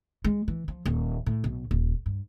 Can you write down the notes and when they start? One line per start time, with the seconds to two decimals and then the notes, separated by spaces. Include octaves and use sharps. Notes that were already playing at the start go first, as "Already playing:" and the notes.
0.24 G#3
0.48 E3
0.68 F3
0.86 D#1
1.26 A2
1.44 B1
1.71 D#1
2.06 G2